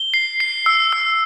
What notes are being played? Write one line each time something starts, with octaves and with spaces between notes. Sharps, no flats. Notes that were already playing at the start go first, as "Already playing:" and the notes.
Already playing: G7
C7
C7
E6
E6